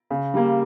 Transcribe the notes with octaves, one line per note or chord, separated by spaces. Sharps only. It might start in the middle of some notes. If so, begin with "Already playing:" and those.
C#3
G3 A#3